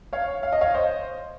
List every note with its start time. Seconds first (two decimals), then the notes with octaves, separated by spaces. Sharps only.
0.13 C#5 F5
0.43 F5
0.53 D#5
0.61 C#5 F5
0.74 C5 D#5